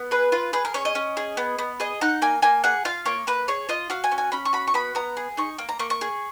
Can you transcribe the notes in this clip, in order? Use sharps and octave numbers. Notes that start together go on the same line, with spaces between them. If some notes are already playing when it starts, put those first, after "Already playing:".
Already playing: B3
G#4 B4
F4 B4
G#4 B4
A#4
C#4 C#5
D#5
C#4
G#4
B3
B3
G#4 D#5
D#4 F#5
A#3 G#5
A#3 G#5
G#4 F#5
F4 F5
A#3 C#5
A#3 B4
G#4 C#5
F4 D#5
F#4 F5
G#5
C#4
G#5
C#4 B5
C#6
F#4 B5
C#6
B3 B5
B3 A#5
G#4
D#4 C#6
A#3
A#5
A#3 C#6
C#6
G#4